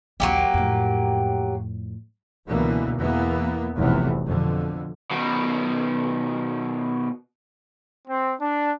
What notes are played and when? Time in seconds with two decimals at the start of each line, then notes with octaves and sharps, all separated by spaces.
0.20 A#1 D#2 F#3 A#3 G4
0.54 F2 A2
2.47 C#2 B2 D3 E3 A#3
2.97 E2 E3 A#3 B3
3.76 F1 B1 E2 A2 C3 E3
4.25 F2 B2 D3
5.11 B2 D#3
8.07 C4
8.40 D4